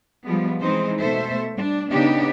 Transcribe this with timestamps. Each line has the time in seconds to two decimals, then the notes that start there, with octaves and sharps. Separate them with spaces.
0.24 F3 G3 G#3 B3
0.60 E3 G#3 C4 D#4 C5
0.99 B2 A3 A4 C5 E5
1.54 G3 D4
1.91 C#3 B3 D4 D#4 G4